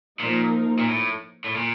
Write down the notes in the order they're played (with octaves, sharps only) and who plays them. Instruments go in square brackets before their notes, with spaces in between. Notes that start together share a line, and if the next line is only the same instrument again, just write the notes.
[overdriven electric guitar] A#2 [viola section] F3 A#3 D#4 A#4
[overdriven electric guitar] A#2
A2
A2
A#2